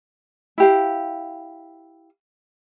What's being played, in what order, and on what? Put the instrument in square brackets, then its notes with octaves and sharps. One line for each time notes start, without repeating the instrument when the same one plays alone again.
[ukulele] E4 G4 F5